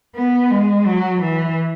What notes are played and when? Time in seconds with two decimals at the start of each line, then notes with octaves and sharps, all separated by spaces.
0.15 B3
0.50 G#3
0.85 F#3
1.21 E3